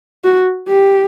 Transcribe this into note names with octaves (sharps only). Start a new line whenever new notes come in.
F#4
G4